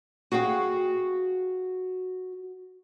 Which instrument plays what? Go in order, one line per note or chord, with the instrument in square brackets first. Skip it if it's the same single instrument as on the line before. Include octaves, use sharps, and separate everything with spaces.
[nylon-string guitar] F#4 G#4 F5 G5